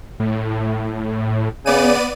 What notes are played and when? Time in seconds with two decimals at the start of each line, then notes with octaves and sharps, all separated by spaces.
0.20 A2
1.66 C#3 B3 D5 D#7